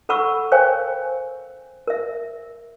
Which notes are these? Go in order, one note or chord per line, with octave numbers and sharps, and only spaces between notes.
A4 F#5 B5 C#6 E6
A#4 C5 C#5 F5 G5 G#5
A#4 E5